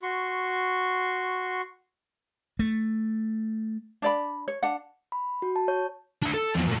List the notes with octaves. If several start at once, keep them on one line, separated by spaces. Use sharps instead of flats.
F#4 C6 C#6
A3
D4 D5 B5
C#5
D4 F#5
B5
F#4
A5
C#5
D4 E5
A4
E2 F3
A#2 A3